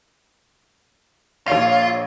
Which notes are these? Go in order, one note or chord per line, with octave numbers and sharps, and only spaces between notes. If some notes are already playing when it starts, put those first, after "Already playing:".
A#1 F4 C#5 C7